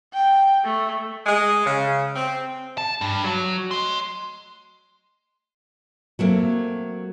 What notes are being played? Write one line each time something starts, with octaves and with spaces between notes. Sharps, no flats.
G5
A3
G#3
C#3
C4
A5
G2
F#3
D#5 C6
F#3 A3 A#3 C4